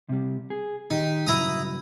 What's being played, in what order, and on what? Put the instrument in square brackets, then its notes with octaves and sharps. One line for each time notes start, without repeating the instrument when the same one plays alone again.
[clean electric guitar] C3 G3
G#4
[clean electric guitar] D#3 G4 [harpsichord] D#4
[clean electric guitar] G2 C#3 F#3 [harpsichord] E4 A#5 D#6